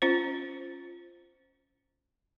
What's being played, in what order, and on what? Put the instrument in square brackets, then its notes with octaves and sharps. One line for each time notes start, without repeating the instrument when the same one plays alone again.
[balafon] C#4 F4 C5